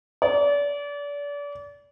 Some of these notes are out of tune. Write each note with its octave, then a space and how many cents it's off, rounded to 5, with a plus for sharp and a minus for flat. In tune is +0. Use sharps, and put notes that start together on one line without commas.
D5 -35